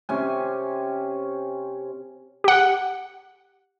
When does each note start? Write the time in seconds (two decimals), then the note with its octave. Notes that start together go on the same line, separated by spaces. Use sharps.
0.09 C3 C#4 G#5
2.44 G4 F#5